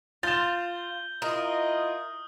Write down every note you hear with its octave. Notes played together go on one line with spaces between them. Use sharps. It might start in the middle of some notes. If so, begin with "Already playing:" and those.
F4 G6 A6 E7 G7
E4 F4 A#4 D#5 D#6 F6